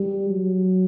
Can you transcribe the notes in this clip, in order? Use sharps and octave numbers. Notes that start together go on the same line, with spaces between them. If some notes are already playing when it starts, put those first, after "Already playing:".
Already playing: G3
F#3